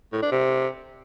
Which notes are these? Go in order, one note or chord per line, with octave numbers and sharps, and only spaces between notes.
A2
D4
C3